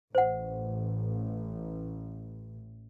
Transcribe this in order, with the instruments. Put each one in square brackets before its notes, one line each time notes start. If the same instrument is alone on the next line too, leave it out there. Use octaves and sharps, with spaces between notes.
[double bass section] A1 [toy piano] C5 F#5